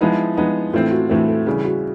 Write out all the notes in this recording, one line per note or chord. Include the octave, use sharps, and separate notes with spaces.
F3 G#3 B3 D#4 E4
F3 G#3 B3 D#4
A2 E3 A3 C4 F4
F#4
A2 E3 A3 C4
A4
C#3 E3 G3 G#4
F#4